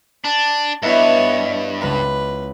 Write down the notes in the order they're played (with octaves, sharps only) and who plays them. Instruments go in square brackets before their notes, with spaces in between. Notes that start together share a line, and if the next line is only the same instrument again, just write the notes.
[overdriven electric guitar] D4 [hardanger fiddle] A5
[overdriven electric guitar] G2 [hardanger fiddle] B3 C#5 [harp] E4 D#5 E5
[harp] C#2 B5 [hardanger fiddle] B4